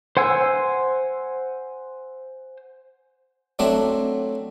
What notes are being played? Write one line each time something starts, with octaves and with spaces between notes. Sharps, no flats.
C5 F#5 G#5 E6
F#3 A3 C4 D4